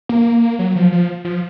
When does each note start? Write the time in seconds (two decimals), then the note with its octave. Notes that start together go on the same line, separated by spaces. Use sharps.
0.09 A#3
0.59 F#3
0.76 F3
0.92 F3
1.25 F3